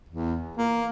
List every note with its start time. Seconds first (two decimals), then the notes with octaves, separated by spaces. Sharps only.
0.09 E2
0.57 A#3